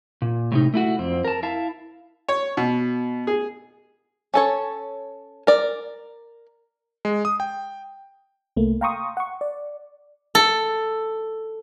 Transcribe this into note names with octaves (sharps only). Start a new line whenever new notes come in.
A#2
A2 C3 D#4
A3 E4 F#4
F2 C4
A#4 A5
E4 E5 F5 A5
C#5
B2
G#4
C#4 A4 C#5
A#4 D5
G#3
D#6
G5
C2 A3 A#3
F5 G5 A#5 C6 C#6 D#6
F#5 C#6
D5
A4